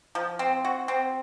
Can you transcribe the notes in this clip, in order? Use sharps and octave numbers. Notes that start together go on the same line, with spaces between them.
F3
C4
F#4
C4